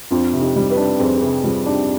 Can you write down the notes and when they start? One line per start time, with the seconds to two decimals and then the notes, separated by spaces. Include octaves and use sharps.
0.11 F2 D4 F4
0.33 C3
0.41 D#4 G4
0.56 G3
0.70 G4 B4
0.77 D4
0.99 F2 G#4 C5
1.17 G#4
1.21 C3 G4 B4
1.44 G3 F4 G#4
1.66 D4 D#4 G4